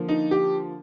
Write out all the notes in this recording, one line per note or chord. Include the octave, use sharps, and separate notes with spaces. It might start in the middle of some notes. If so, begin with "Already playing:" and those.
Already playing: D3 F3 A#3
D#4
G4